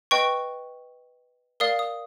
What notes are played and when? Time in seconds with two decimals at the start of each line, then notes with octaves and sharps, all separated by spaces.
0.11 B4 D#5 G5 C#6
1.60 A#4 D5 F5 D#6
1.79 D#6